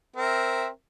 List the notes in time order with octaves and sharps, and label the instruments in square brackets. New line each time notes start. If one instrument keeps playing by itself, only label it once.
[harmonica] C4 A#4 E5